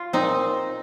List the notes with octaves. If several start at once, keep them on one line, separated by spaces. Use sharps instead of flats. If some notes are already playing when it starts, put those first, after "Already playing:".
Already playing: F4
A#2 C4 D#4